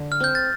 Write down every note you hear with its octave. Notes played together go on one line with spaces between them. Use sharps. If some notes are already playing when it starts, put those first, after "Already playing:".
Already playing: D3
F6
C4 G6
A6